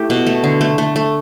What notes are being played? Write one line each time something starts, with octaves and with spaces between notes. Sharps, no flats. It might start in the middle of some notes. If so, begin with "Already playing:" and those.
Already playing: A3 E4 G4
B2
A3
D3
A3
A3
A3